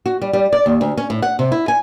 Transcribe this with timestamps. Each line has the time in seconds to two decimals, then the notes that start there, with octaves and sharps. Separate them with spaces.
0.06 F#4
0.22 G3
0.33 G3
0.53 D5
0.66 D#2
0.81 D2
0.97 C#4
1.10 A2
1.22 F#5
1.39 C3
1.52 E4
1.68 G#5